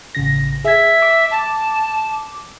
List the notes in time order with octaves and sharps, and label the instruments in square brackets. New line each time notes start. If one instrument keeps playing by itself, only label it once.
[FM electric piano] A1 C#3 A#6
[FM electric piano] G#4 G#6 [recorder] E5
[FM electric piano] D6
[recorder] A5